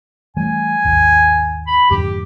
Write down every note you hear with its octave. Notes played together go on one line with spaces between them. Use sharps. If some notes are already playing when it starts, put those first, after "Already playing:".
E3 G3 A3 G#5
G#1 D#2
B5
F2 G#2 D3 G4